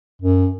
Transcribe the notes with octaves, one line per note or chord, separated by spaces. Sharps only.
F#2